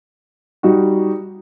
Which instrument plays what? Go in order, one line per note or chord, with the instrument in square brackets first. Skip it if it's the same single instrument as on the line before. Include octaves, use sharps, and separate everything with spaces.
[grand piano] G3 D#4 F#4